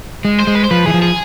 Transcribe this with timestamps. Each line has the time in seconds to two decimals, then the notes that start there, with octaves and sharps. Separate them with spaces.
0.25 G#3
0.40 C5
0.47 G#3
0.55 B4
0.64 C5
0.71 F3 B4
0.86 E3 G#4
0.94 F3
1.02 G#4